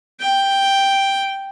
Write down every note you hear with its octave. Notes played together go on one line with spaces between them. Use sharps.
G5